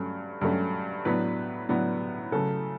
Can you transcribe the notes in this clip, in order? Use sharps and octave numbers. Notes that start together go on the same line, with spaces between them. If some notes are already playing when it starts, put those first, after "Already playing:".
Already playing: G2 F#3 A3 C#4
G2 F#3 A3 C#4
A2 F#3 B3 D4 B4
A2 F#3 B3 D4
C#3 F#3 A3 A4